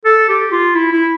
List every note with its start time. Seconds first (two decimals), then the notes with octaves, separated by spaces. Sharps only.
0.05 A4
0.29 G4
0.52 F4
0.75 E4
0.93 E4